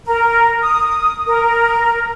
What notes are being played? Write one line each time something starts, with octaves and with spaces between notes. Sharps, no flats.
A#4
D#6
A#4